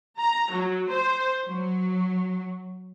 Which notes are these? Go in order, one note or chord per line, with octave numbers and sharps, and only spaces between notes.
A#5
F#3
C5
F#3